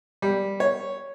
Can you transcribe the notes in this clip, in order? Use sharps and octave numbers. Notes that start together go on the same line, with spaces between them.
G3
C#5